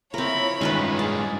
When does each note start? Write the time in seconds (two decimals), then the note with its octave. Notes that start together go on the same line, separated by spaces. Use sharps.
0.14 F3 C4 E4 A#4 C#5 B5
0.61 G2 D#3 G#3 C#4 F4 B4
0.99 G#4 D5